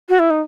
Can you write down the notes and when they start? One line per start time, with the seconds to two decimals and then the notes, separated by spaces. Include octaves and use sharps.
0.09 F#4
0.19 E4
0.30 D#4